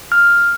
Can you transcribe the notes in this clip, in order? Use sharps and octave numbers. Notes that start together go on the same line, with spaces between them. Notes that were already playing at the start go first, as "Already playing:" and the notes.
F6